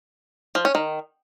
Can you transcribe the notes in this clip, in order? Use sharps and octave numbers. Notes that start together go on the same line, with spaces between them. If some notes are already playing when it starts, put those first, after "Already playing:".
F3
C#4
D#3